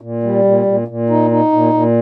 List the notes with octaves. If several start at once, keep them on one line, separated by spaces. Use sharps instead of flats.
A#2
G3
A#2
A#2
A#2
D#4
D#4
A#2
A#2